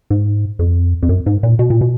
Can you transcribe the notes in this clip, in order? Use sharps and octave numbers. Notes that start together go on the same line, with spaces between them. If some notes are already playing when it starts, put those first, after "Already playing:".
G#2
F2
F2
F#2
G#2
A#2
B2
A#2
B2